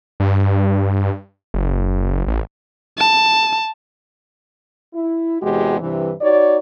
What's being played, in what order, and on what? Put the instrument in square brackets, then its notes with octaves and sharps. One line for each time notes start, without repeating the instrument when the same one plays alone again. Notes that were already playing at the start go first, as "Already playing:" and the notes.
[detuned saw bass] G2
F#1
A1
[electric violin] A5
[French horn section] E4
E2 C3 G#3 F#4 G4
G2 C3 E3
D#4 F#4 C#5 D5